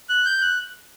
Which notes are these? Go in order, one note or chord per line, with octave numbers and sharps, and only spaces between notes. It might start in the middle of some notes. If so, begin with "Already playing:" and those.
F#6
G6
F#6